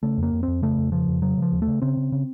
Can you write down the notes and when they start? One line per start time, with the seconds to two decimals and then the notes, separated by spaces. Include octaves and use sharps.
0.03 C#3 A3
0.18 F2 A#3
0.33 F2
0.43 F2 C4
0.62 C#3 A3
0.78 F2
0.92 C#3 F3
1.08 F2
1.22 C#3 F#3
1.37 C#3 F3
1.52 D#2
1.62 A3
1.67 C#3
1.82 C#3 C4
1.97 C#3
2.12 C#3